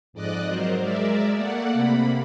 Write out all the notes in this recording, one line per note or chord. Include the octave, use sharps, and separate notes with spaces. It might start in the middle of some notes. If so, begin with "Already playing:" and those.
F2 G#2 D5 D#5 F#6
F#3 A#4 C5
G#3 A#4 D5 E5
A3 A#3 D5 F#5
C3 A#3 B5